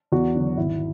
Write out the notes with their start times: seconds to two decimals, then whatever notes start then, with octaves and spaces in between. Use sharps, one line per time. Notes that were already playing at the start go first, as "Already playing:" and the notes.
0.12 E2 F#4
0.35 D3 F#3
0.57 G#1 E4